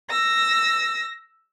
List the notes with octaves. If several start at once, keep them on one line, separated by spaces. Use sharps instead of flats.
E6 A#6